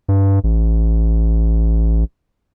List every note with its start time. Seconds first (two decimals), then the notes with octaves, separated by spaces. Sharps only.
0.09 G2
0.44 A1